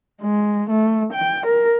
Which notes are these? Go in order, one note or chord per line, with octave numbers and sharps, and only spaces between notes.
G#3
A3
G5
A#4